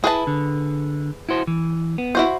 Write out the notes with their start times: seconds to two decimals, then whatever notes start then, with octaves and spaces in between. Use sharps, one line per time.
0.04 E4 G#4 B4 A5
0.27 D3
1.29 E4 F#4 C5
1.47 E3
1.98 B3
2.15 E4 F#4 C5